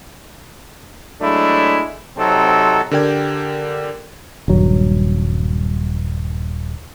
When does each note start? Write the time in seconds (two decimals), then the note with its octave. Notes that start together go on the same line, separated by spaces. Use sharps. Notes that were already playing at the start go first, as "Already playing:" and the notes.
1.21 F#3 G#3 A3 D4 E4
2.16 C3 F#3 C4 D#4 A4
2.91 D3 G4 A#4 D5 G5 G#6
4.48 D#1 G2 F#3